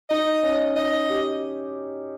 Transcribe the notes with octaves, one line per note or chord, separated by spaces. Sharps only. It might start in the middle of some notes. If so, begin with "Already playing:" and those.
D#4 D#5
C#4
D#4 D#5
G4